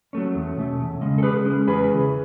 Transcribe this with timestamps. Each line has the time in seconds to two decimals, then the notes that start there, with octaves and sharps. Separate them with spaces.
0.13 F#3 A3 C#4
0.35 E2
0.57 B2 A3 C#4
0.80 E2
1.01 C#3 G#3 C#4
1.18 A4
1.23 C#3 G#4 B4
1.45 G#3 C#4
1.67 E2 G#4 B4
1.90 C#3 E3